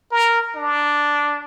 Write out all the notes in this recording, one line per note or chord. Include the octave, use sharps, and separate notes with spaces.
A#4
D4